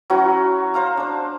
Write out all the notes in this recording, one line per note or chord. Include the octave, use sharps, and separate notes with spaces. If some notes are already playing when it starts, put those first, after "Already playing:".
F#3 C#4 E4 F#4
C5 F5 A#5
D4 C5